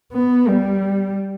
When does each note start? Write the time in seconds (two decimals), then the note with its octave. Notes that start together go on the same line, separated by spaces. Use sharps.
0.13 B3
0.48 G3